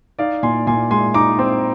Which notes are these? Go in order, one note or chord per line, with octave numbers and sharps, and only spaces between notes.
D#4 D5 F5
A#2 G#5 C6
A#2 G#5 C6
G#3 G#5 C6
D#4 A#5 D6
C4